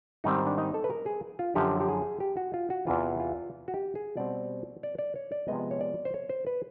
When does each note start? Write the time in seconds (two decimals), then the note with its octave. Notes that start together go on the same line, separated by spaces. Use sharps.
0.24 G#2 D#3 G3 C4 D#4
0.47 D4
0.58 D#4
0.74 A4
0.84 B4
0.90 A#4
1.06 G#4
1.39 F4
1.55 F#2 D3 F3 G4
1.80 G4
1.89 G#4
2.20 G4
2.37 F#4
2.54 F4
2.70 F#4
2.87 E2 C3 E3 F4
3.20 F4
3.68 F#4
3.74 G4
3.95 G#4
4.17 B2 G3 C4 D5
4.83 D5
4.99 D5
5.16 C#5
5.32 D5
5.48 C3 F3 G#3 B3 D#5
5.71 C#5
5.81 D5
6.05 C5
6.14 C#5
6.29 C5
6.47 B4